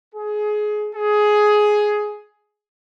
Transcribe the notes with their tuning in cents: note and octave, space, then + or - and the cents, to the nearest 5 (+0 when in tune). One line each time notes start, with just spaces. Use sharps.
G#4 +20
G#4 +10